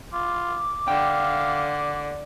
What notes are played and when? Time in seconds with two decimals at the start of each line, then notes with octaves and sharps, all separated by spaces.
0.13 F4 D6
0.88 D3 F5 G5